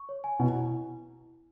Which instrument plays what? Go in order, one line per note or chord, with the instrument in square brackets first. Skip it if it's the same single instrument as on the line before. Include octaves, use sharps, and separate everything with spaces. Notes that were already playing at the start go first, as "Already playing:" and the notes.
Already playing: [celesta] C#6
C#5
G#5
[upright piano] B2 [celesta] E4
[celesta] E4